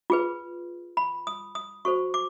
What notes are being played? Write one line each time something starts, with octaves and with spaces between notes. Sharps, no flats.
F4 G#4 B4
B5
D#6
D#6
F#4 A4 C5 C#6
D6